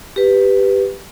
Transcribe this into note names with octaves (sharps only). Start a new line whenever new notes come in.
G4 B4